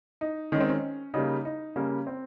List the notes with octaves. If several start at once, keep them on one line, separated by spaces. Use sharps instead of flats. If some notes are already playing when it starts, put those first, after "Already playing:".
D#4
D#3 G#3 C4 C#4
C#4
C#3 G3 A#3 D#4
D#4
C#3 G3 A#3 C#4
C4